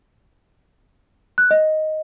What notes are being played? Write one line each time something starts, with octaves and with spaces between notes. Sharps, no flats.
F#6
D#5